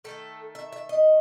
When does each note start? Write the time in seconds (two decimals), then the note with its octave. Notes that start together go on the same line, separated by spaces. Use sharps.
0.04 D#3 A3 A4
0.55 E5
0.73 E5
0.89 D#5